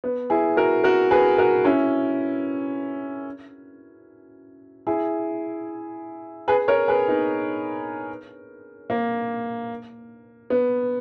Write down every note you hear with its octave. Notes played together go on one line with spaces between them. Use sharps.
B3
E4 G#4
F#4 A#4
F#4 A#4
G#4 B4
F#4 A#4
C#4 E4
E4 G#4
G#4 B4
A#4 C#5
G#4 B4
B3 D#4
A#3
B3